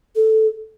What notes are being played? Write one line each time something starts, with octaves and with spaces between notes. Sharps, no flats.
A4